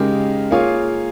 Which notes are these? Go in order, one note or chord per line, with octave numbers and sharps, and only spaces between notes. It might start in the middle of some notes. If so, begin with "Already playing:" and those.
Already playing: C#3 G#3 D#4 G4 A#4
A#3 F4 G#4 C#5 F5